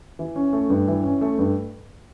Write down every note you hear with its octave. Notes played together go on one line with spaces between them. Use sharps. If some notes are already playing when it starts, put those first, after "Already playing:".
E3
C#4
A3
G2
E3
C#4
A3
G2